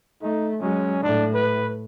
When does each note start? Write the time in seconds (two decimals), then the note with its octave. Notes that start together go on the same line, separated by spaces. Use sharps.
0.22 A3 D#4
0.61 F#3 G#3 C#4
1.03 A2 D4
1.34 B4